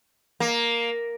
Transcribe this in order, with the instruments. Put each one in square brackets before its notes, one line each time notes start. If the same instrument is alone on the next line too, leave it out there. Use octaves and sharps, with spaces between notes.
[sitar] A#3